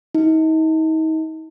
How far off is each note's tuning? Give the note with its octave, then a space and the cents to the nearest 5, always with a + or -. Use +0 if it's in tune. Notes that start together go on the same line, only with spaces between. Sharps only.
D#4 +35